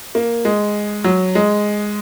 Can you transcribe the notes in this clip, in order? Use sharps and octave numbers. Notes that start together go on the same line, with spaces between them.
A#3
G#3
F#3
G#3